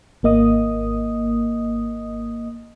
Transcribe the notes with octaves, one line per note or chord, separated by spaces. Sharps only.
G#1 A#3 D#5 D#6